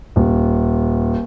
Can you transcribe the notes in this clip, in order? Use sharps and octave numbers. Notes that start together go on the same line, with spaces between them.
D#1